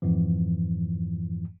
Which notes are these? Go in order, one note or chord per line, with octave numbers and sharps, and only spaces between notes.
F2 G#2 E3 F3